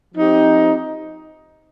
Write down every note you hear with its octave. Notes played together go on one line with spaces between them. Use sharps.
F3 C4 D#4 G4